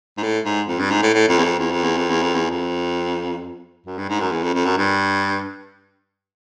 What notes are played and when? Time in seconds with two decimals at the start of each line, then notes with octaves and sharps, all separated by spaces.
0.17 G#2
0.23 A2
0.45 G#2
0.68 F2
0.79 G2
0.91 G#2
1.02 A2
1.14 A2
1.29 F2
1.39 E2
1.44 F2
1.59 E2
1.71 F2
1.83 E2
1.97 F2
2.10 E2
2.22 F2
2.34 E2
2.50 F2
3.86 F#2
3.98 G2
4.09 G#2
4.20 F#2
4.31 E2
4.43 F2
4.54 F2
4.65 F#2
4.77 G2